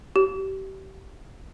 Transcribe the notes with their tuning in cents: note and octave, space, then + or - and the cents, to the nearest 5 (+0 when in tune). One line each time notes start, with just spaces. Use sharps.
G4 -30